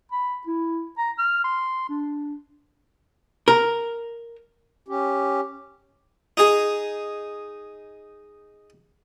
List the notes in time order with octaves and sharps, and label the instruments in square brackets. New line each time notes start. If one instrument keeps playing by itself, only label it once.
[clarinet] B5
E4
A#5
F6
C6
D4
[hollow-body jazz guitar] A#4
[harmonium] C#4 G4
[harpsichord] D#4 G#4